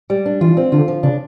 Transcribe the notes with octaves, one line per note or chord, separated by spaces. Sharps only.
G3
D4
E3 F4
C4
D3 F4
F3
C#3 D4